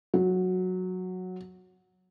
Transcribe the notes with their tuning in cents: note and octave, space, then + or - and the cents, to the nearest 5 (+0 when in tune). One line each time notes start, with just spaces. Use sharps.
F#3 -10